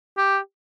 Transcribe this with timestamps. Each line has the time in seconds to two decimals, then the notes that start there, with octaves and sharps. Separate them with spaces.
0.17 G4